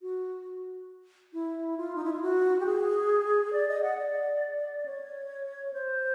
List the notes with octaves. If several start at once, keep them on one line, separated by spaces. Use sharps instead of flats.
F#4
E4
F4
D#4
E4
F4
F#4
G4
G#4
D5
D#5
F#5
D5
C#5
C5